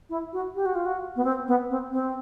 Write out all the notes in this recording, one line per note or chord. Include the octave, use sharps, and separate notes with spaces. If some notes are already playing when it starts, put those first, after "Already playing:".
E4
F#4
G4
F#4
F4
F#4
B3
C4
B3
C4
C4